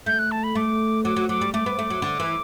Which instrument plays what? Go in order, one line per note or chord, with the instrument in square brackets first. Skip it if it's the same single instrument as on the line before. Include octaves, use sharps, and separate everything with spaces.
[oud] A3 [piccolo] G6
[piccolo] F#6
A5
B5
[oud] A3 [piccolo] D6
[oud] F#3 [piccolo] D6
[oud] F#3
[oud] F#3 [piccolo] D6
[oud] G3
[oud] A3 [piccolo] D6
[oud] B3
A3
F#3
D3
E3